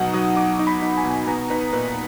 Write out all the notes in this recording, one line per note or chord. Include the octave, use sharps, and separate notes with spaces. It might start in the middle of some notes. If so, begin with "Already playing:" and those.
Already playing: B2 F#3 D#4 F#5
F#3 D#6
D#4 D6
D#4
B5
D#4
G#5
B2
B3 A#5
D#4 B4
A#2 B4